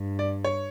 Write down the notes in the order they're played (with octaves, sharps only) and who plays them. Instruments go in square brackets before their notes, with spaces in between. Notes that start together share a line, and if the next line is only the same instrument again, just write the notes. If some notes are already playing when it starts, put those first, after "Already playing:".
Already playing: [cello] G2
[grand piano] D5
C#5